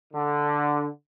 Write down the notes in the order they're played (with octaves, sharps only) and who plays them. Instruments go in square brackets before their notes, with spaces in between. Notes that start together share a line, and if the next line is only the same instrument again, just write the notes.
[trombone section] D3